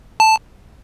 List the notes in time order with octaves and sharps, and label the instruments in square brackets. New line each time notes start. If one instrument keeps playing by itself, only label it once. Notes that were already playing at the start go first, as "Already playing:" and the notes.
[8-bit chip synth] A5